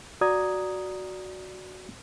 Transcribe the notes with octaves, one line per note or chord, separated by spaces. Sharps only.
F#4 D5 A#5 D#6 G#6